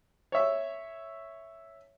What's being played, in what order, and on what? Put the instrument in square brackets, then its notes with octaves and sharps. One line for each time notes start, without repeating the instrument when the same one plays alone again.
[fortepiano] C#5 E5